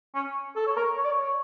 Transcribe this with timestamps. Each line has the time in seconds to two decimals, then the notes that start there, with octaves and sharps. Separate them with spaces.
0.15 C#4
0.56 A4
0.67 C#5
0.76 A#4
0.97 C#5
1.05 D5
1.12 C#5